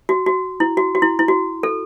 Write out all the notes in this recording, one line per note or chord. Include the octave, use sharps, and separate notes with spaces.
F#4
F#4
E4
F#4
F#4
E4
E4
F#4
A4